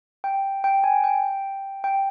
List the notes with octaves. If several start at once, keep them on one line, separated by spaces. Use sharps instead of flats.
G5
G5
G#5
G5
G5